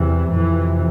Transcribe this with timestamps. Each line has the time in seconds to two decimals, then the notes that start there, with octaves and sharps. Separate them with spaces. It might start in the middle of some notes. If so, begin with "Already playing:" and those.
Already playing: E2 C3 E3
0.34 F2 C3 E3